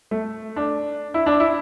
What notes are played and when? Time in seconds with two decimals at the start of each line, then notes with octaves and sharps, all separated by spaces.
0.11 A3
0.56 D4
1.14 E4
1.26 D4
1.40 E4